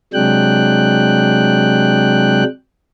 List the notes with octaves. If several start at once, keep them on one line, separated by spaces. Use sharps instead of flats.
C3 F#3 G#3 D4 G5 F#6